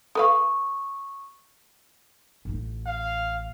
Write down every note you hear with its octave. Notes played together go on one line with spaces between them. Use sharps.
A4 B4 F5 C#6 D#6
A1 D#4
F5